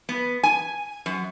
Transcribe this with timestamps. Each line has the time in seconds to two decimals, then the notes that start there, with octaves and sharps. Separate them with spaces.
0.09 B3
0.43 G#5
1.06 F#2